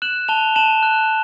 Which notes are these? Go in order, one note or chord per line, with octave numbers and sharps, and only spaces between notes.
F#6 E7 F#7
A5 F7 G7
A5 E7 F#7
F#6